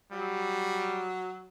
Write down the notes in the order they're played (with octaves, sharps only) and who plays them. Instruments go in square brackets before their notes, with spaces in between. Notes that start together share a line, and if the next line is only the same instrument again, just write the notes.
[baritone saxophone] F#3 [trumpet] G3